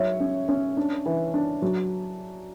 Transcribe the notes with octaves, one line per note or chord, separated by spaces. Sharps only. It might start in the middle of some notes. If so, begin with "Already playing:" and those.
Already playing: F#3 G#3 C#5 E5
C#4
C#4
D4
E3
D4
F#3